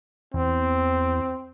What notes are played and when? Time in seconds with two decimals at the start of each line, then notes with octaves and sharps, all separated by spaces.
0.34 E2 C4